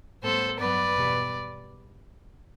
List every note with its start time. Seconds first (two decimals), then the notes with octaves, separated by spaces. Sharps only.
0.22 A2 G3 B3 A4 C5
0.58 G2 F#3 B3 B4 D5
0.95 E2 B2 G3